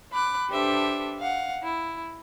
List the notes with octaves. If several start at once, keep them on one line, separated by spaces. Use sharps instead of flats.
B5 D6 F#6
D4 G4 A4 B4 C5 E5
F5 F#5
E4